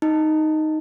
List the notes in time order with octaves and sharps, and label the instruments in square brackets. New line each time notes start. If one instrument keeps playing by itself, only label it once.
[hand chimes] D#4